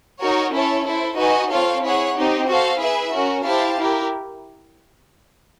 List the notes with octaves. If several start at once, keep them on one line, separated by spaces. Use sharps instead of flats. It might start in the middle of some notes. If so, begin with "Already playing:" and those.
D#4 F#4 A#4 C#5
C#4 E4 A4 C#5
E4 A4 C5
D#4 F#4 B4 D#5 G#5
C4 F4 A4 C#5 F5
E4 G#4 C#5 F#5
C4 D#4 G4
F#4 A4 C5 F5
E4 G#4 B4 E5
C#4 F#4 A#4
E4 G4 C5 F5 A5
E4 G4 A#4